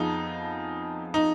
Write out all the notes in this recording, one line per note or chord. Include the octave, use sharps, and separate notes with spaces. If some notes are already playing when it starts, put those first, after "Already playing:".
Already playing: F2 F3 B3 D#4 F4 G#4
D#4